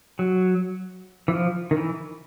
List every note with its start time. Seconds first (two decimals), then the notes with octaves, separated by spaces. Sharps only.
0.19 F#3
1.28 E3
1.33 F3
1.71 D#3
1.77 E3